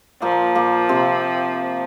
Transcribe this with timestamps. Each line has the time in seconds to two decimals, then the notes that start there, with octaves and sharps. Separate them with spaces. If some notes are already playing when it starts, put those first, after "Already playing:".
0.22 A#2 F3 A#3
0.55 A#2 A#3
0.89 C3 C4